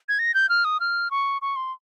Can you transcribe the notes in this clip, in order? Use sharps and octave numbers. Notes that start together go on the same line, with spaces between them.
G#6
A#6
G6
F6
D#6
F6
C#6
C#6
C6